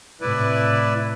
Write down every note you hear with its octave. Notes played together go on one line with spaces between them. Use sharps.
A2 C3 E4 B4 D5